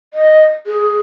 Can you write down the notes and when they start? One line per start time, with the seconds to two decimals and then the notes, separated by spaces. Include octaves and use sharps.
0.14 D#5
0.67 G#4